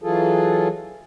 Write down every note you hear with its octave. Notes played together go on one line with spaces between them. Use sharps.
E3 F#3 F4 G#4 A4